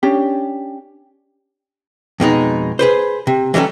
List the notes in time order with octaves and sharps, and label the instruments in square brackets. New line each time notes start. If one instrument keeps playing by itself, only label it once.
[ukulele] C#4 D4 G4
[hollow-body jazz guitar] F2 B2 G#3 D#4
G#4 B4 C5
C3
E3 F#3 G3 C#4 A4